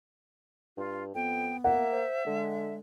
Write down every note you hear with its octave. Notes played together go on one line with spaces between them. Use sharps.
G2 F4
F2 B3 G5
A#3 E5 F#5
C5
D3 G#3